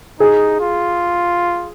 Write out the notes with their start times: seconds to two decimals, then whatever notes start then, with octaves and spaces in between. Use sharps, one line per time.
0.20 D#4 G#4
0.60 F4